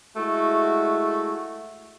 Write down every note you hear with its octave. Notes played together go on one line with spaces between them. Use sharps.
G#3 A3 E4 F#4